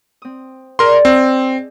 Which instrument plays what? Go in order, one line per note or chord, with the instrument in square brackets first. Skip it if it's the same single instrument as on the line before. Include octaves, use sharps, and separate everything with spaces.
[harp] C4 D#6
[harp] G#4 D5 D#5 [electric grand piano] A#4 C6
[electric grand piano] C4